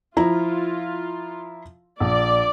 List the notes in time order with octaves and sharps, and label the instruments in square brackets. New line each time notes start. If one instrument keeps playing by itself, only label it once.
[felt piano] F3 E4 A#5 [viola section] F4
[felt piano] A#1 [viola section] D5